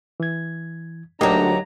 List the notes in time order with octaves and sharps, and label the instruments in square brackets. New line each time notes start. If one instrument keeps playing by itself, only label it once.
[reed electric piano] E3 G#6
[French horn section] D2 D4 [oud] F#3 A#3 [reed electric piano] D#4 G4 D#5 [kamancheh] A#5